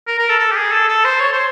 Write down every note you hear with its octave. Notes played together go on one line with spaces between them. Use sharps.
A#4
A#4
A4
A4
G4
G#4
A4
A4
C5
C#5
C5